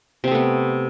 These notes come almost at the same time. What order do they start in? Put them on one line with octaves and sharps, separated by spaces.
C3 C4 A3 B3